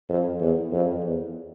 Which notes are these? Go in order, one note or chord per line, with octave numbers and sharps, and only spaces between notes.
F2
E2
F2
E2